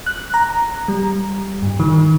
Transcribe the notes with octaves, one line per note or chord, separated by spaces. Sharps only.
F#6
A#5
G3
G2
D#3